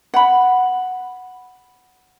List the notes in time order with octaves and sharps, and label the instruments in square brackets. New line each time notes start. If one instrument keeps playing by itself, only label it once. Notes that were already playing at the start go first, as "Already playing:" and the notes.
[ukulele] F#5 B5